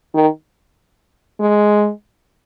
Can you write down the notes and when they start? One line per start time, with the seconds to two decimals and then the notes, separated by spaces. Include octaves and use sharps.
0.14 D#3
1.40 G#3